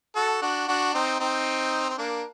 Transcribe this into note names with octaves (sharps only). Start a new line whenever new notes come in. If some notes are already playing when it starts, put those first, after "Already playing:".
F#4 A4
D4 F#4
D4 F#4
C4 D#4
C4 D#4
C4
A#3 D4